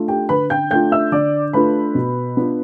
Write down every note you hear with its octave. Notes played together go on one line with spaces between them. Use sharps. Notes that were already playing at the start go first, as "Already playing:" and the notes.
Already playing: A3 D4 F4
G4 G5
D3 B4 B5
G5 G6
A3 D4 F4 G5 G6
E5 E6
D3 D5 D6
A3 D4 F4 B4 B5
B2
B3 D4 F4